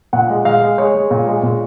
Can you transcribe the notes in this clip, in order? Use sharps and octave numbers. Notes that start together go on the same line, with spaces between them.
A#2 F#5
G#3
G#3 F5
G#3
G#3 C#5
G#3
A#2
G#3
A#2